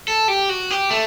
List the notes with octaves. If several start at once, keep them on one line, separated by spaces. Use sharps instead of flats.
A4
G4
F#4
G4
A3